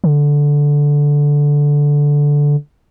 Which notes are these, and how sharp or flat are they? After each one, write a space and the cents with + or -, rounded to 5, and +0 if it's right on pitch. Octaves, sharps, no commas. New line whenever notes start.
D3 -10